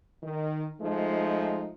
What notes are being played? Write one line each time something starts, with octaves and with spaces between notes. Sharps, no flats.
D#3
F3 G#3 A3 D#4